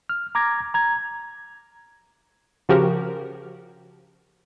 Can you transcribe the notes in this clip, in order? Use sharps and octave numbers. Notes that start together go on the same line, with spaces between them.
F6
A#5 D6 G#6 A#6
A#5 G#6
C#3 F3 F#4 G4 A#4